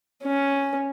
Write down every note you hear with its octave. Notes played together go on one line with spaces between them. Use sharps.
C#4